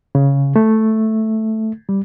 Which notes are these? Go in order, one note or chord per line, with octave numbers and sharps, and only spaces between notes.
C#3
A3
G3